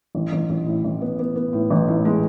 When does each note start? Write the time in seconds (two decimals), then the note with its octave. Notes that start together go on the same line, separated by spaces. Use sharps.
0.15 A1
0.32 A1
0.49 A1
0.66 A2
0.84 A1
1.01 B3
1.19 B3
1.36 B3
1.53 A2
1.70 A1
1.88 A2
2.05 G#3